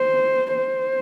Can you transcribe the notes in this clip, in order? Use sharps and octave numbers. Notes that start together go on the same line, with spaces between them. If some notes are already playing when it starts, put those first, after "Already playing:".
Already playing: C5
C5